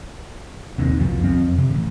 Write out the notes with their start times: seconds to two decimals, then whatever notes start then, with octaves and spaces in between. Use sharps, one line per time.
0.78 D#2 C3 D#3
0.99 C2 F2 F3
1.24 F2 F3 C4
1.58 C3
1.71 A1